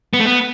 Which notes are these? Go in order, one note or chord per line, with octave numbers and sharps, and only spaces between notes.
B3
A3
B3